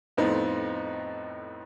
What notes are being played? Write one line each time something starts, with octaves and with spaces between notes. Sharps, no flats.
F2 A2 B3 C4 D#4